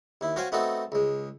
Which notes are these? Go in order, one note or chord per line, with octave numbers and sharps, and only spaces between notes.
D#2 E4
C#4 F#4 C5 F5 G5 G#5
A3 B3 C4 D#4 F#4 A4
C#2 G#3